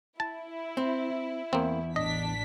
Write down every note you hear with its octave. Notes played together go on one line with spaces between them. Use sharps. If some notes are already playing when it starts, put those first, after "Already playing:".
E4 A5
C4
E2 A#3 C4
A1 D4 D#5 B6